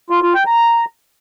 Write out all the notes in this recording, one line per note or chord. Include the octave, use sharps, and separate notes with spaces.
F4
F4
G5
A#5